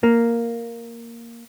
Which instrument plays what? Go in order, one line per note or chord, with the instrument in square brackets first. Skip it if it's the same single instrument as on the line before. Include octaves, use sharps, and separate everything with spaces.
[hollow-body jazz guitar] A#3